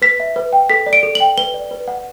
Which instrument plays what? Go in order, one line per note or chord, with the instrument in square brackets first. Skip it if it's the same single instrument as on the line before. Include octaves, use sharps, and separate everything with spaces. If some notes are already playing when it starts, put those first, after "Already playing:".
[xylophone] B4 B6
E5
B4
G5
A4 B6
D5
D7
A4
F#7
G5
B4 G7
D5
B4
F#5